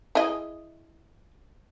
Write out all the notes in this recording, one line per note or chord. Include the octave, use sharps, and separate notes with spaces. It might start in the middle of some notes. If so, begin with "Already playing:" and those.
E4 G#4 D#5